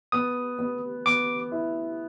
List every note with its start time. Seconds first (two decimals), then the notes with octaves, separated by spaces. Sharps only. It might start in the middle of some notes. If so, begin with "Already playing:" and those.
0.12 B3 D#6
0.59 B3
1.06 B3 D6
1.52 E4